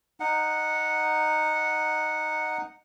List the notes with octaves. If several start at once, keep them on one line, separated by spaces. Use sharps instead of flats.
D#4 F#5